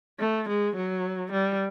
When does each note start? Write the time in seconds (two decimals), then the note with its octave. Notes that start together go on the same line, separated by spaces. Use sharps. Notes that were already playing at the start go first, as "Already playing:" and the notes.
0.19 A3
0.48 G#3
0.76 F#3
1.32 G3